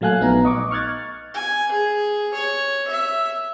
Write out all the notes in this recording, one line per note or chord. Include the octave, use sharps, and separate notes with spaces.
A#2 F#3 A3 F5 G#5 F#6
A#1 B3 D#4 A#5
D#5 C#6 D6
C#6 F6 F#6 G#6 A6
G#5
G#4
C#5
E5